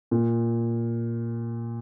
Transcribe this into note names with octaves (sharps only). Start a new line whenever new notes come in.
A#2